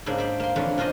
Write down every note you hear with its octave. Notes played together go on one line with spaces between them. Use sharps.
G#2 C#3 A#3 D4
C5 D5 E5
A#3 C6
F2 D3 E3 C#4 D4 C#5
C#4 D4 F4 C5 D#5